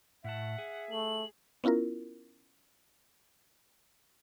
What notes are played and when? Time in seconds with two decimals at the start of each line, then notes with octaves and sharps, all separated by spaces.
0.24 A2 E5 F#5 A5
0.58 G#4
0.91 A3 F#7
1.64 B3 C#4 E4 F4 A#4